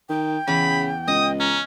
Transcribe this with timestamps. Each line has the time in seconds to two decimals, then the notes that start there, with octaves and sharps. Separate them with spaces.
0.09 D#3 G5
0.48 E2 C#3 B5
1.08 C#2 D#5 D#6
1.39 C#4 A#5